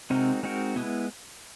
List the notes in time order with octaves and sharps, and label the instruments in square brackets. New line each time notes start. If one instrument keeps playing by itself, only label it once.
[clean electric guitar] C3 [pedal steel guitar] G#3 C4 D#4 F#4 A#4
[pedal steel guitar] G#3 C4 D#4 F#4 A#4
[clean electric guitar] B2 [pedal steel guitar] G#3 B3 E4